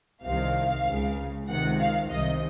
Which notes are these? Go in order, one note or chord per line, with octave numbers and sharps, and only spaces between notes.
C2 C3 D#3 F5
C#2 C#3
C#2 C3 D#3 F#5
F5
C2 C3 D#3 D#5